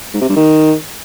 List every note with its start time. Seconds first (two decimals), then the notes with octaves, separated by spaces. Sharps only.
0.14 G#2
0.21 C3
0.29 G2
0.36 D#3